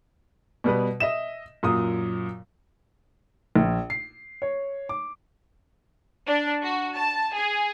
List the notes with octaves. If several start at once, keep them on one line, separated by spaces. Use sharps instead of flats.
B2 G3 B3 B4
D#5 E5 E7
F#2 A#2 F#3 D#6
A#1
C7
C#5
D6
D4
F#4
A5
G#4